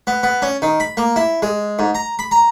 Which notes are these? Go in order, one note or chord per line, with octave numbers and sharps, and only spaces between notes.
B3
B3
C#4
D#3
B5
A#3
E4
G#3
G#2
A#5
B5
A#5